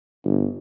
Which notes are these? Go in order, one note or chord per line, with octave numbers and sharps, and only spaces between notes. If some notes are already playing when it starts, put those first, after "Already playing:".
G1